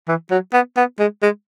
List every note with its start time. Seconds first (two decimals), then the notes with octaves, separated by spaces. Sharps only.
0.08 E3
0.31 F#3
0.53 B3
0.77 B3
0.99 G#3
1.22 G#3